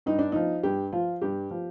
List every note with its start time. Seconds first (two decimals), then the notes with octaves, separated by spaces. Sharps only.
0.06 G2 D#4
0.19 D4
0.32 F3 D#4
0.63 G2 G4
0.93 F3 F4
1.22 G2 G4
1.51 F3